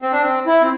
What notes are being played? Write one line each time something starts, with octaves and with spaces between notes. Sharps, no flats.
C4
D4
C4
E4
C4